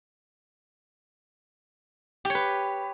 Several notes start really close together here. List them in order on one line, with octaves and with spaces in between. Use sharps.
G4 C#5 B4